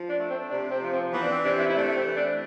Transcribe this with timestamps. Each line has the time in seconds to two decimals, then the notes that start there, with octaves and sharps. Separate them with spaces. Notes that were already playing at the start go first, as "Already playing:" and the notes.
Already playing: F3
0.10 D4
0.19 A3
0.30 C4
0.50 C3 D4
0.71 C4
0.82 F3
0.93 C4
1.13 E3 B3
1.23 D4
1.29 C4
1.44 C3 D4
1.60 E4
1.70 E4
1.75 A3 D4
1.96 C4
2.07 E3
2.17 D4